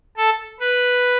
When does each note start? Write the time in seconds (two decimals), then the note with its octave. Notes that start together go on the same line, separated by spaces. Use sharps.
0.17 A4
0.60 B4